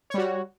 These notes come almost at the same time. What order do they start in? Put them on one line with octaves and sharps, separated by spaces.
C#5 G3 F#4